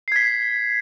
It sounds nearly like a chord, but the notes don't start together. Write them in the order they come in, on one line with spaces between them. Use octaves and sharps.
C7 G#6 B6